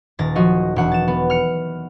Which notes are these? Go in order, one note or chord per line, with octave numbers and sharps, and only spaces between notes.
D#1 A6 A#6
F3 F#3 F#4 D#5
E1 F#4 F#5
A6 E7
B3
F6 C#7